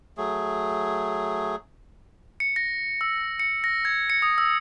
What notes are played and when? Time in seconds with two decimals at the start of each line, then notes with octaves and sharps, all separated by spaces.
0.17 F#3 A3 G#4
2.40 C#7
2.56 A#6
3.01 E6
3.40 C#7
3.64 A#6
3.85 G#6
4.10 C#7
4.22 D#6
4.38 E6